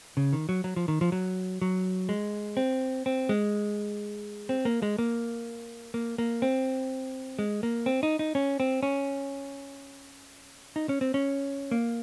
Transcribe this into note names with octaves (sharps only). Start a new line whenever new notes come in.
C#3
D#3
F#3
F#3
F3
D#3
F3
F#3
F#3
G#3
C4
C4
G#3
C4
A#3
G#3
A#3
A#3
A#3
C4
G#3
A#3
C4
D#4
D#4
C#4
C4
C#4
D#4
C#4
C4
C#4
A#3